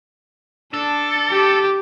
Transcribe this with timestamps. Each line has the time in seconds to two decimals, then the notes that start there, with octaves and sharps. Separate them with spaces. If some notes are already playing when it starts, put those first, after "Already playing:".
0.74 D4 A4
1.31 G4